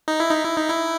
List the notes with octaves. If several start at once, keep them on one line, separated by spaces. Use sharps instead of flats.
D#4
E4
D#4
E4
D#4
E4